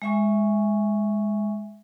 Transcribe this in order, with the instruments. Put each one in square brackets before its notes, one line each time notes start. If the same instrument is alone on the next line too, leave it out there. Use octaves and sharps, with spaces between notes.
[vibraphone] G#3 E5 G#5 C#6